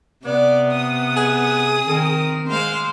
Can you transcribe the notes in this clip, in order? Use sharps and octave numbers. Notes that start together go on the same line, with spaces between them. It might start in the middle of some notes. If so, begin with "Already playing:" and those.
C3 B3 D5
D#6
G#4
D#3 C4 A#4
G#3 C5 F5 C6